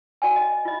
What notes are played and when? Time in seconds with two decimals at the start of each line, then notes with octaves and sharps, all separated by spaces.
0.22 F#4 D5 G5 G#5
0.36 D#5
0.52 D#5
0.65 F4 D#5